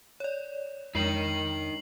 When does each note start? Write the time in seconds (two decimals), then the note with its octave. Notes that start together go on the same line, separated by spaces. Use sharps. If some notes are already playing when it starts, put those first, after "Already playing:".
0.20 C#5 D5
0.95 F2 G#3 D4 D#4 A#4 C7 F#7